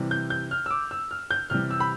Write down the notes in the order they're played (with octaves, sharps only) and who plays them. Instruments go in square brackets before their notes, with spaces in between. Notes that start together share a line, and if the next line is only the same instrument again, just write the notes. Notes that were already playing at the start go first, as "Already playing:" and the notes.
Already playing: [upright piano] C3 E3 G3
G6
G6
F6
E6
D6
E6
F6
G6
C3 E3 G3 F6
E6
B5